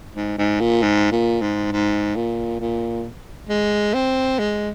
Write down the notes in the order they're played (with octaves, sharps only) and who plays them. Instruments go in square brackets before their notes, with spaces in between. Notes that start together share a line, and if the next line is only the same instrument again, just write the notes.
[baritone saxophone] G#2
G#2
A#2
G#2
A#2
G#2
G#2
A#2
A#2
G#3
C4
G#3